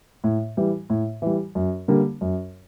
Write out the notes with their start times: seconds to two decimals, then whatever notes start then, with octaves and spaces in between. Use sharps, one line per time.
0.24 A2
0.57 E3 G3
0.90 A2
1.22 E3 G3
1.55 F#2
1.88 D3 G3 A#3
2.21 F#2